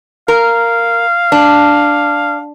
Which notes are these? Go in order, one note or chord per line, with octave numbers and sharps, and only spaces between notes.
A#4 F5
D4